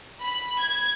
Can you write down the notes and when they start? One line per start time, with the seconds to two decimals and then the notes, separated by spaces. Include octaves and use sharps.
0.22 B5
0.59 G#6